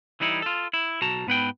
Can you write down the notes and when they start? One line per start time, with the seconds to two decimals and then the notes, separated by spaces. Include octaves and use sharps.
0.20 E3 G3 D#4 E4
0.42 F4 A4
0.73 E4
1.01 B1 F#4 A5 A#5
1.27 G#2 B3 B4 G5